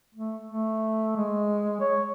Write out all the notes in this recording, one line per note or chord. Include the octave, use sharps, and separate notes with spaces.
A3
A3
G#3
C#5